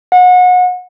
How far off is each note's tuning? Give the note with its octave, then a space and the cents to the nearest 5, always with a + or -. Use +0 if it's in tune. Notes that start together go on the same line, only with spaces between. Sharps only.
F#5 -30